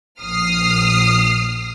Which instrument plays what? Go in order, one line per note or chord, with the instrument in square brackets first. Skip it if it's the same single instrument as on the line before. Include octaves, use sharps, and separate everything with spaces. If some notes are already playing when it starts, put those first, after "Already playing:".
[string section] A#1 D#6 F6 C7